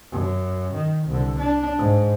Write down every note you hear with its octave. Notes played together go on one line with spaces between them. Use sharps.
F#2
D#3
C2 D3
D4
G#2